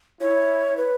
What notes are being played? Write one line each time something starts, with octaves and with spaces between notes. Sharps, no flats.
E4 C#5
B4